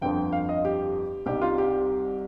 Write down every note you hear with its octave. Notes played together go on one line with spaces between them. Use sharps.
G1 F2 D3 F3 G5
F5
D#5
G4
C2 C3 G3 C4 D#4 G4
F4
G4